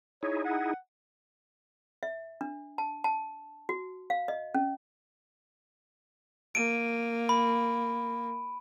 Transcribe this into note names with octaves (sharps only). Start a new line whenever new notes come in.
D#4 E4 G#4 C#5
F#5
E5
D4
A5
A5
F#4
F5
D#5
C#4
A#3 D7 D#7
B5